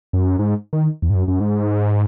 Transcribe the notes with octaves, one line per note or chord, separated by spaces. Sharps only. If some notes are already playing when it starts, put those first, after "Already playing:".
F#2
G#2
D#3
E2
G#2
F#2
F#2
G#2